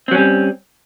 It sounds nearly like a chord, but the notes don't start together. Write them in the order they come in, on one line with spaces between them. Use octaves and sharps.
C4 F#3 C#4 G3